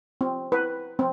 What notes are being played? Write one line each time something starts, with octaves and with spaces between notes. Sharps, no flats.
C4
B4
C4